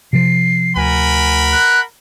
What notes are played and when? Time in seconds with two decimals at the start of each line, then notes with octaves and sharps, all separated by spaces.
0.13 C3 F3 C7
0.76 D2 A#4 F#5 G#5 B5
1.52 F#6